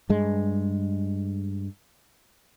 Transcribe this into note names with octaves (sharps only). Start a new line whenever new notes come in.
G2 G#3